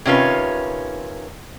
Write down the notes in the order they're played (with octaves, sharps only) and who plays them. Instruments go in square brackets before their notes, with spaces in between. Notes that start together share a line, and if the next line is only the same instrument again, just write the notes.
[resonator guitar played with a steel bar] C3 D#3 C#4 F4 B4